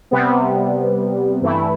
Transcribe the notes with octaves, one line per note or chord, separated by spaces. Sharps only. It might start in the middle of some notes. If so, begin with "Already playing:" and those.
C3 G3 B3
G2 E3 A3 E4